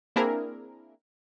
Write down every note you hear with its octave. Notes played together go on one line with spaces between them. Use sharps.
A#3 C4 D4 E4 G#4 A#4